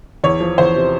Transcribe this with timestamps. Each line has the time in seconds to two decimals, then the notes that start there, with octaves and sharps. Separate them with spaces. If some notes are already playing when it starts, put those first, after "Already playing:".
0.24 E2 C#5
0.40 F3
0.58 E2 C5
0.76 C3